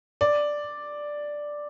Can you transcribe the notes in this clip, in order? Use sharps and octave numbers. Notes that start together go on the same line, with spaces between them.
D5